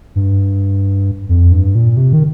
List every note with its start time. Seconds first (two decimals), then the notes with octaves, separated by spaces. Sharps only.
0.16 G2
1.29 F2
1.52 G2
1.75 A#2
1.97 C3
2.13 D#3